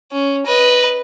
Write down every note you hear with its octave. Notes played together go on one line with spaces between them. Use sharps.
C#4
B4 D#5